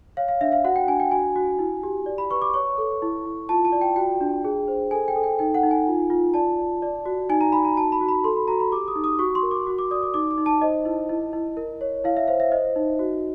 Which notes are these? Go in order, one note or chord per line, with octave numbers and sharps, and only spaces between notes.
C#5 F5
F5
D4 E5
F5
F#4 F#5
G5
D4 G#5
G5
F#4 G#5
F#4
E4
G4
D5
B5
B4 C#6
D6
C#5 C#6
A4
E4
E4
F4 A5
A5
D5
G5
F#4 G5
D4
G#4
C5
A4 G#5
G5
A4
G5
D#4 G5
F#5
D#4
G#5
F4
F4
D5 A5
D5
D5
F#4
D#4 G#5
A#5
D#4 B5
A#5
F#4 A5
B5
F#4
B5
A4 C6
B5
F#4 A#5
B5
G4 D6
D#6
D#4
D#6
F#4 C#6
C6
A#4
D6
F#4
D6
D5 D#6
D6
D#4 D6
D6
D#4
A5
C5 D#5
E4
E4
E4
A#4
C#5
E4 F5
E5
C5 F5
E5
C5 D#5
D#4
F#4